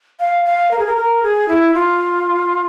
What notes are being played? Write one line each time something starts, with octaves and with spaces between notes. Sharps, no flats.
F5
F5
A#4
G#4
A#4
A#4
G#4
E4
F4